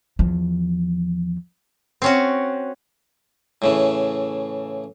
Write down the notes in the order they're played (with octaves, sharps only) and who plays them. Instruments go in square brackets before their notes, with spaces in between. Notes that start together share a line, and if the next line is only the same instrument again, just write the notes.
[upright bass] E2 F3
[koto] C4 C#4 F#4
[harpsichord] A2 C#3 E3